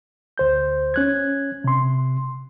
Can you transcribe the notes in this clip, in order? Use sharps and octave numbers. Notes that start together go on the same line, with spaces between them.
D2 C5 G6
C#4 F#6 G#6
C3 C6